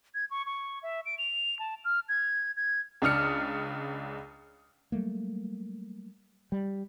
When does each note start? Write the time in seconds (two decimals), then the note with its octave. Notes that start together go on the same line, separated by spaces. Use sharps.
0.15 G#6
0.31 C#6
0.46 C#6
0.83 E5
1.06 D7
1.18 F7
1.59 A5
1.85 F6
2.09 G#6
2.57 G#6
3.02 C#2 D4 D#6 F6 C#7
4.92 F#3 G3 A3 A#3
6.52 G3